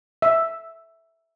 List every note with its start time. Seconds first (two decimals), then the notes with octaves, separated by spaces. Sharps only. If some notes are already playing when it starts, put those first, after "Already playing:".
0.22 E5